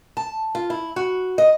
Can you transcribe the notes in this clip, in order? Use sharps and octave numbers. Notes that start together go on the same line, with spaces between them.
A5
F4
E4
F#4
D#5